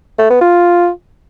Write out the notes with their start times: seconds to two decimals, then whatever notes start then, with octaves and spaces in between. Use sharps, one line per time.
0.19 A3
0.30 B3
0.41 F4